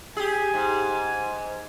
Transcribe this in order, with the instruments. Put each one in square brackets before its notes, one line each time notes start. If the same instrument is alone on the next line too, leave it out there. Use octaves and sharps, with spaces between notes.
[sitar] G4 G#4 [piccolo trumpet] G#5
[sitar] G#2